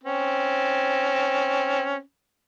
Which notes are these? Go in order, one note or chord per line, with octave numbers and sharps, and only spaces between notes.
C4 C#4